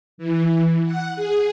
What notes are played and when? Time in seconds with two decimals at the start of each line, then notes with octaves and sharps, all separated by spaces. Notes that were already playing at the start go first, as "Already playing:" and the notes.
0.18 E3
0.84 F#5
1.16 G#4